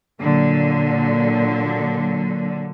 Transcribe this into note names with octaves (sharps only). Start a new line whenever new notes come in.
A#2 D3 F#3